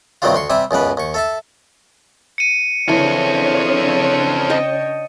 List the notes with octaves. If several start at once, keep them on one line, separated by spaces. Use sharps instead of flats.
G2 C3 D#3 F#3 G3 F4
D2 C6 C#6
C3 G3 E5 G#5
C#2 F#2 B2 B4
D#2 C#6
A4 E5 A5
C#7 D#7
C#3 E3 C4 D4 A4 C#5
D#5 G5 A5